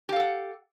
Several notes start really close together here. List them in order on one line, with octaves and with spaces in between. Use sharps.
G4 F5 A4 F#5